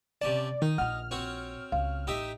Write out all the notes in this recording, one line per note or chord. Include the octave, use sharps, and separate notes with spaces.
C3 C#4 D5 A5
D#3 D#4
A#1 F4 F#5 F6
C4 F#4 C#5
C#2 F5
A1 D#4 G4 E5